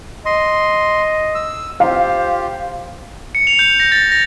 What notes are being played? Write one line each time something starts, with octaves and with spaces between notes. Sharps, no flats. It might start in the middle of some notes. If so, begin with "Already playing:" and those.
D#5 C6
E6
F4 G4 C5 F5
C#7
F7
G6
A#6
A6
A#6